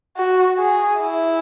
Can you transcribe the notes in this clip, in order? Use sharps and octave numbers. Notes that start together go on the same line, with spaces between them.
F#4
G#4
E4